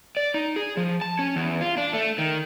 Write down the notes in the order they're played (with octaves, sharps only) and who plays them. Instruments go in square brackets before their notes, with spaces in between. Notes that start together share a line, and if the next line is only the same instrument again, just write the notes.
[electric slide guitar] D5
D#4
G#4
F3
A5
C#4
E2
F4
D4
A3
D#3